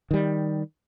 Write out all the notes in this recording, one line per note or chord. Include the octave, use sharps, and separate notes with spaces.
D#3 G3